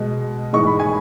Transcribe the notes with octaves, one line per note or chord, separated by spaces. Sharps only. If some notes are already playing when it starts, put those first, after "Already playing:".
Already playing: B2 G#3
G#2 E3 G#3 C#6
B5
G#5